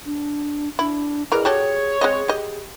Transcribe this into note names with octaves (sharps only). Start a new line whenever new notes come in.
D4
D4 E4
E2 E3 G#4 A#4 D#5 F6
F#4 G4 A4 C#5
G#3 C4 G#4 D#5
G4 D#5